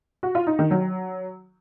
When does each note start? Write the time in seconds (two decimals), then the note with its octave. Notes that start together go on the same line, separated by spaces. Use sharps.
0.23 F#4
0.35 F4
0.47 D#4
0.59 D#3
0.71 F#3